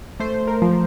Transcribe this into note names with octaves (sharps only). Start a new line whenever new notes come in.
A3 C5
A#4
F3